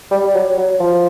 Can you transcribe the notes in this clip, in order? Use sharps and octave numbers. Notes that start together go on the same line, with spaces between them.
G3
F#3
F#3
F3